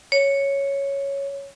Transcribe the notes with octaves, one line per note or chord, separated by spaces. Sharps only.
C#5